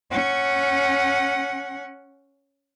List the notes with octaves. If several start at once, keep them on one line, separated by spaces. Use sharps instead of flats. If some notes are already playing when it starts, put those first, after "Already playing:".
C#4 F#5